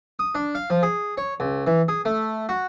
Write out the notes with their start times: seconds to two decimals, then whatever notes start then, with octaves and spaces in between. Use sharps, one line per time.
0.19 D#6
0.35 D4
0.55 F5
0.70 F3
0.83 G#4
1.17 C#5
1.40 C#2
1.67 E3
1.88 G#4
2.05 A3
2.49 F#4